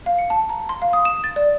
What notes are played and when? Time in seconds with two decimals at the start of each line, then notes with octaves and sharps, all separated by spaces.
0.06 F5
0.18 C#7
0.30 A5
0.49 A#5
0.69 C6
0.82 F5
0.93 D#6
1.05 E7
1.24 A6
1.36 D5